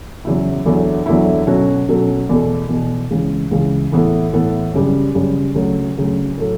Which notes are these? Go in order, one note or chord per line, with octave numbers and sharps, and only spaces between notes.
E2 C#3 F#3 B3 E4
E2 D3 F#3 A3 E4
E2 D3 F#3 A3 E4
B2 F#3 C#4 F#4 A4
B2 F#3 C#4 F#4 A4
E2 B2 A3
E2 B2 A3
C#2 C#3 E3
C#2 C#3 E3
A2 E3 B3 E4 A4
A2 E3 B3 E4 A4
F#2 C#3 G3
F#2 C#3 G3
D2 C#3 F#3 A3
D2 C#3 F#3 A3
A2 F#3 A3